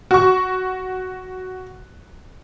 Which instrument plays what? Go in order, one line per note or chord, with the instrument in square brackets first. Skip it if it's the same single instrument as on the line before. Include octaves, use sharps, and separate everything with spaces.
[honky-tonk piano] F#4 C#6